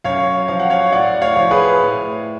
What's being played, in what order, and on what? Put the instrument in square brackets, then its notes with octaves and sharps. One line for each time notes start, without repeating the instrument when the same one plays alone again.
[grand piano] F#2 C#5 F5
F3 F5
F#5
C#5 F5
A2 D5 F#5
C#5 F5
F3
G#4 B4
A2